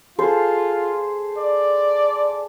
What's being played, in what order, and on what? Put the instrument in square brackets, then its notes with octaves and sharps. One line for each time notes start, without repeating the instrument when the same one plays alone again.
[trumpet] F4 [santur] G#4 A4 C5
[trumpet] D5